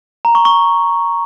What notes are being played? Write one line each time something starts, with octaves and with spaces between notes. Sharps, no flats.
A#5
C#6
C#6